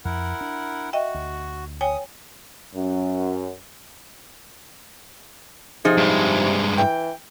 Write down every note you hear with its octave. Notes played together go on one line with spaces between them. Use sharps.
F2 E4 A#4 F#5
D4
F#4 D#5 E5 G5
D2
C#5 G5 G#5 D#6
F#2
C3 F3 D#4 G#4
G2 G#3
E3 G5